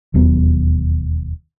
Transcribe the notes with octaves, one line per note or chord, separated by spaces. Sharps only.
E1 D#2 F#3 B3